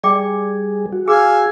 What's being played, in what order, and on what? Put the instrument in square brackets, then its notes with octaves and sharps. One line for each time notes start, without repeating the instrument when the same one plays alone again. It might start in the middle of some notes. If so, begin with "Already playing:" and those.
[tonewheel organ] G3 G#4 [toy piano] D5 G5 D6
[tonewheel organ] F#4
[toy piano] G#4 [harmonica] F5 G#5 E6